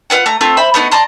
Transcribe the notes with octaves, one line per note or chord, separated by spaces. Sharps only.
F4 B4 D5 F#5
A3 A#5
A3 C4 F4
C5 E5 B5
A3 B3 D#4 F#5
D5 A5 A#5 C6